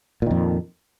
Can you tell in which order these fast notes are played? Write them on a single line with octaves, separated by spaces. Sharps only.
A#2 D#3 F2